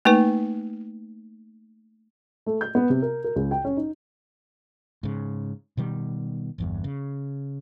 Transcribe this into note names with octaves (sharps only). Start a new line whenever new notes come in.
A3 A#3 D#4 B4
A3
G6
B3
C3
A#4
A#4
C#2
G5
C#4
D#4
G#2 C#3
B2 D#3 G3
G1 E2 G2
C#3